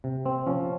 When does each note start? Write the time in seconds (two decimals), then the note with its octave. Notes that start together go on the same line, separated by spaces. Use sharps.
0.04 C3
0.26 C4
0.47 F3 C#4